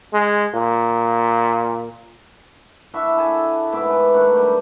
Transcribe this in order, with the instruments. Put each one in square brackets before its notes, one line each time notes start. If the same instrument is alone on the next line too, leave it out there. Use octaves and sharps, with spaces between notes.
[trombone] G#3
A#2
[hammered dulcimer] D4 E4 F#4 E5
G#4 A4 G#5 A5
G#2 B3 E5 D6
B4 G#5
D#3 A3 D4 F#5
G3 G5